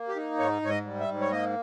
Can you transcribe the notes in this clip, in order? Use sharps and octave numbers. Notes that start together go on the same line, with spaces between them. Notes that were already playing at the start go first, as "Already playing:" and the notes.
Already playing: A#3
G4
D#4
G#2 C#5
G#2 C#5
D#5
G3
E5
G#2
C#5
A#3 D#5